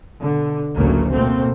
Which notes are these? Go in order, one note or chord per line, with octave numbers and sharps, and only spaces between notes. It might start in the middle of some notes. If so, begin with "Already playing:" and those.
B2 D3
A1 D2 C#3 F#3 A3 A#3
B2 A3 A#3 C4